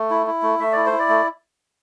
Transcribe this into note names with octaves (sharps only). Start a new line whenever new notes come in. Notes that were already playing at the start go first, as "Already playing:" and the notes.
Already playing: A3
E4
E4
A3
A3 E5
E4 D5
C5
E4
D5
A3